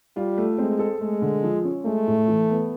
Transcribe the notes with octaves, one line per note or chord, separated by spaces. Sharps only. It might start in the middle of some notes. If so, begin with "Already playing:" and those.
G3 F4
A3
G#3 C4
A4
G#3 A3
D3
F3
C#4
G#3 A3
A2
E3
B3